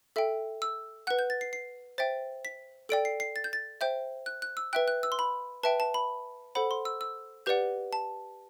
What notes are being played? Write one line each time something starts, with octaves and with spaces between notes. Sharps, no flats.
A4 E5 G5
E6
B4 F#5 F#6
G6
A6
C7
C7
C5 E5 G5 A6
B6
A4 D5 G5 D7
C7
C7
A6
G6
A6
C5 E5 G5 G6
F#6
F#6
E6
B4 E5 G5 F#6
F#6
E6
C6
B5
B4 E5 G5 A5
A5
B5
A4 C5 F#5 B5
C6
E6
E6
G4 B4 D5 F#5 G6
A5